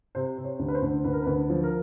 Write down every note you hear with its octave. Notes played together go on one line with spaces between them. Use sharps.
C3 C5
C3
C#5
D2
B4
C5
D2
D2 B4
A#4
B4
D2
B4
F3
A#4